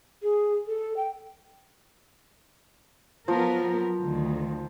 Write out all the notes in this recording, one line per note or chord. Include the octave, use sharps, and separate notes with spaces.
G#4
A4
G5
F3 F#3 B3 A#4
D2 D#3